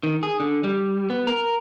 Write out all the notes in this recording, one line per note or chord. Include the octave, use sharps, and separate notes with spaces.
D#3
G#4
D3
G3
B3
A#4